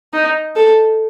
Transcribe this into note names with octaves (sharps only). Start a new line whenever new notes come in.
D#4
A4